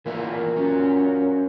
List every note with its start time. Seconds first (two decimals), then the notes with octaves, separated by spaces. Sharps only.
0.06 A#2 E3 A#3 E4
0.56 F#3 C#4